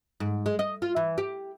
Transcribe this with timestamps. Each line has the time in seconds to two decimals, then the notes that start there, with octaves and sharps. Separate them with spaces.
0.20 G#2
0.46 G#3
0.59 D#5
0.82 F4
0.96 E3
1.18 G4